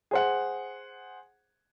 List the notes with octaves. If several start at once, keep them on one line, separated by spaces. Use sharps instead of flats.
G#4 C5 F#5